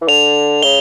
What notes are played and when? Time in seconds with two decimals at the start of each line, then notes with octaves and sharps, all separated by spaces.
0.02 E3
0.08 D3 F7
0.63 C#3 G7